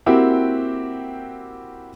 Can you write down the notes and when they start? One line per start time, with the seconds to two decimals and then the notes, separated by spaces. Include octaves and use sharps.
0.06 A#3 C4 E4 F#4 G4